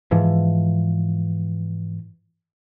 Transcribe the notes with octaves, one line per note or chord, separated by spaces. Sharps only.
G#2 E3 F3